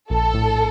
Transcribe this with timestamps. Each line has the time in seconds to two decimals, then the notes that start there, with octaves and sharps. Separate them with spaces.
0.10 A#1 A4
0.34 A2